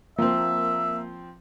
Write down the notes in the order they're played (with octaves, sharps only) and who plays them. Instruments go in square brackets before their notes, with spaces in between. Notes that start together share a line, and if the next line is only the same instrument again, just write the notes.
[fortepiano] F3 C4 [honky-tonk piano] A#3 [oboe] E5